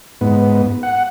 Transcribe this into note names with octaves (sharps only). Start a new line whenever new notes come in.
G#2 B3
F#5